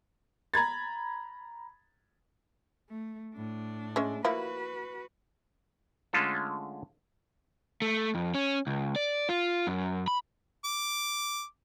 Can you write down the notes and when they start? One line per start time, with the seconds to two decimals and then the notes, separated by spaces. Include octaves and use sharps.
0.54 A#5 B5 G#6 A6
2.90 A3
3.35 A2 D4
3.96 G#3 C#4 E5
4.24 F3 A#3 E4 F#4 B4
6.13 D3 G#3 A3 C#4 F4 A4
7.82 A3
8.15 F2
8.35 C#4
8.67 C#2
8.96 D5
9.29 F4
9.67 F#2
10.08 B5
10.65 D6